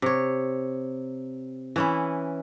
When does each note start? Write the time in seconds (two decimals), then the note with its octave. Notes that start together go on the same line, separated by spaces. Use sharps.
0.02 C3 C#5
1.76 E3 C#4 E4